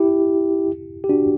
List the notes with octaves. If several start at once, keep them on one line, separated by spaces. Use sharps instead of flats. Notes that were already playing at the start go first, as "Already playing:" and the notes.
Already playing: E4 G4
G4
D4 F#4